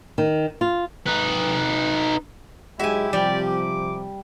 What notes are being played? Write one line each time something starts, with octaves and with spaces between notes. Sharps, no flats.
D#3
F4
D#4 B4
G#2 F#3 G#3 E4 G4 E5 G#5
C3 F3 G3 D5
D6